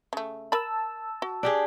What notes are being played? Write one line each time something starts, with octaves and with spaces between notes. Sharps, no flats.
C#3 A3
A#4 A5 B5 E6
F#4
D4 G4 G#4